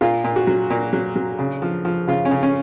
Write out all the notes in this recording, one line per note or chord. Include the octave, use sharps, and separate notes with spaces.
A#2 F4
A#2
F#4
F#3
A#2
F#3
F#3
C#3
F3
F3
C#3 F4
C#4
C#3
C#4